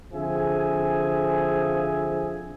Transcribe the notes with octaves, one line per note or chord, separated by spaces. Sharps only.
D3 F3 C4 G#4 E5 G#5